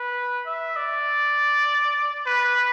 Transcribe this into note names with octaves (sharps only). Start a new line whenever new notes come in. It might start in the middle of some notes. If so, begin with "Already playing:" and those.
Already playing: B4
E5
D5
B4